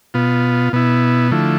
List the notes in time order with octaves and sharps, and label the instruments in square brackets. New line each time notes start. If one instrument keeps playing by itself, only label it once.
[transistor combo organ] B2 B3 F4
B2 B3 E4
D3 F3 A3 E4